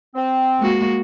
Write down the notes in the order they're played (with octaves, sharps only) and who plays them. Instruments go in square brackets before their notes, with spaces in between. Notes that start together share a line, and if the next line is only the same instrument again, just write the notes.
[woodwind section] C4
[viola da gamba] G#3 A#3 F#4